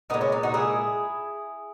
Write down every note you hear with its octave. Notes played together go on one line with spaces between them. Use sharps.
A#2 G#3 B3 D#4
C#4 E4
B3 D#4
D#4 F#4
E4 G#4